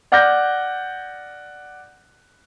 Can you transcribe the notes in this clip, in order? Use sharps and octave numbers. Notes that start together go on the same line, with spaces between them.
D5 F#5 D6 F6 G6 A#6